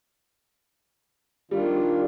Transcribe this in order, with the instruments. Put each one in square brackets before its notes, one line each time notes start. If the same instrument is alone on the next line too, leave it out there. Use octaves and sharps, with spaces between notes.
[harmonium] D#3 D4 F4 [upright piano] G3